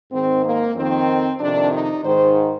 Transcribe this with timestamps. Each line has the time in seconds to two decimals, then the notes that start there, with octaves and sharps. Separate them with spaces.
0.11 G#2 D#3 C4
0.44 A#3
0.75 F2 D#3 C4
1.39 F2 C3 D#3 D4
1.71 D#4
2.03 G#2 D#3 C5